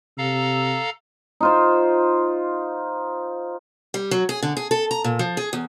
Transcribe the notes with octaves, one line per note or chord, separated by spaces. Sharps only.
C3 A4 F5 A#5
D#4 F4 C5
G3
F#3
G#4
D3
G#4
A4
A#5
A#2
F3
G#4
E2